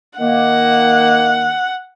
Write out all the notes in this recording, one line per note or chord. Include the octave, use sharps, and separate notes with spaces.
D#3 A#3 F#5